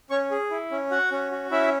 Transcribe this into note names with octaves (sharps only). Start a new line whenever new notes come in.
C#4 C#5 C#6
G#4
E4
C#4
F#4 F#5
C#4
F#4
C#4 E4 E5